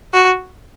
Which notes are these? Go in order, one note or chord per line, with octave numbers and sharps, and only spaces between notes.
F#4